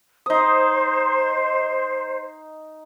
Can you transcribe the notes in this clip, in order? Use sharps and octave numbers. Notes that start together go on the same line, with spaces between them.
D#4 C5 D#6